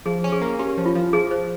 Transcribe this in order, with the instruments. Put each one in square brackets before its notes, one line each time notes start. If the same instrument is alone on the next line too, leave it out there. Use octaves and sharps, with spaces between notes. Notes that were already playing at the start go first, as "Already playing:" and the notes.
[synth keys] F3 [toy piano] G#4
[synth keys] C#4
[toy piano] G#4
[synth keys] A#3
[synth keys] C#4 [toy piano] G4
[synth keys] F3
[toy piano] F4
[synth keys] F3
[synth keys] F3 [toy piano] G#4
[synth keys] F3 [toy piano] C5